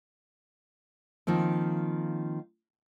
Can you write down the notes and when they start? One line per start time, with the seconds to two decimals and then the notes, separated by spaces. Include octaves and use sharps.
1.27 D#3 F3 A#3 C4